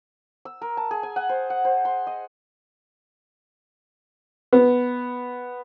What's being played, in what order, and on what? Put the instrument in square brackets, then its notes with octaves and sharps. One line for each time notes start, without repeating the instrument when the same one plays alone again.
[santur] E6
A#4
A5
G#4
G#5
F#5
C5
F#5
C5
C6
D#5
[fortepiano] B3